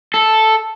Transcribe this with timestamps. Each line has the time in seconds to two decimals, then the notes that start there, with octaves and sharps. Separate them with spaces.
0.14 A4